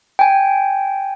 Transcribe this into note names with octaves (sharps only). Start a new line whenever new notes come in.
G5 G#5